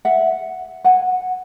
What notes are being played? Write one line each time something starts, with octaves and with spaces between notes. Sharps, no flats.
E5 F#5
F#5 G#5